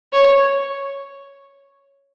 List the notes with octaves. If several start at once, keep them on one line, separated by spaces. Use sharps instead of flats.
C#5